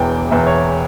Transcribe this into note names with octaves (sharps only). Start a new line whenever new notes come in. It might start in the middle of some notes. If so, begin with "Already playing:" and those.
Already playing: E1 E2 E3 G5
E1 E2 E3 E5
C#5